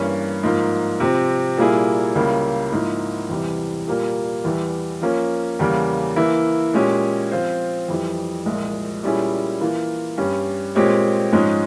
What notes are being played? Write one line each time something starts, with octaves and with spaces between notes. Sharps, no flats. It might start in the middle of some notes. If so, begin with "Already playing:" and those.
Already playing: G2 E3 A#3 C#4
G#2 F3 A#3
C3 F3 C4
A#2 G3 A#3 E4 G#4
C#2 C#3 G3 A#3 E4
G#2 F3 A#3 E4
E2 C3 E3 G3
A#2 G3 A#3 F4
E2 E3 G3
F3 A#3 C#4
E2 C#3 G3 A#3
E3 A#3 E4
A#2 G#3 C#4 G4
F3 C4 F4 C5
F2 E3 G3
C2 A#2 F3 G#3
A#2 G3 C#4 E4 G#4
E3 A#3 F4
G2 G3 C#4
A#2 G#3 C4 G4 C#5
G#2 F3 G#3 C#4